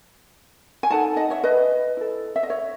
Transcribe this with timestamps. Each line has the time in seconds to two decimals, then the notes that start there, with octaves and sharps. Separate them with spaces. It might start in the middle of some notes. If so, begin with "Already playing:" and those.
0.83 G#5
0.90 D#4 A4 F#5 A5
1.16 D#5 F#5
1.30 C#5 E5
1.44 B4 D#5
1.97 E4 A4
2.36 E5
2.43 D#5
2.50 C#5